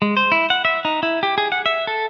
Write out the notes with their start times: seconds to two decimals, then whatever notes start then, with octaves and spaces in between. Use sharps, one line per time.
0.02 G#3
0.17 C5
0.32 E4
0.50 F#5
0.65 E5
0.85 D#4
1.03 E4
1.23 G4
1.38 G#4
1.52 F#5
1.66 E5
1.87 A4